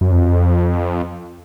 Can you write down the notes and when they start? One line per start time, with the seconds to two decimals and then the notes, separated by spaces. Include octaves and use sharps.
0.01 F#2
0.12 F2